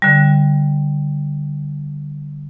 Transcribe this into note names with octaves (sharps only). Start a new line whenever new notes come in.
D3 G3